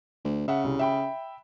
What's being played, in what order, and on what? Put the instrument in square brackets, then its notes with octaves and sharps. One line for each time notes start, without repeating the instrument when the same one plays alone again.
[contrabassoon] D2
[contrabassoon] C#3 [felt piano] E5 F#5
[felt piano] C2
E5 G5 B5